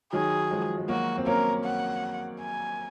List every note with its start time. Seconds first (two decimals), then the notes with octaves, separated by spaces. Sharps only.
0.12 D#3 F#3 G#4
0.51 F3 G#3
0.78 G#3
0.88 F#3 A#3 F#4
1.18 C4
1.27 A#3 C#4 A#4
1.65 F#5
2.41 G#5